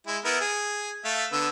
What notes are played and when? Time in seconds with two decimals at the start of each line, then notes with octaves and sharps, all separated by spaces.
0.07 G#3 E4
0.24 B3 E4 A#4
0.41 G#4
1.05 A3 E5 F5
1.32 D3 B3 E6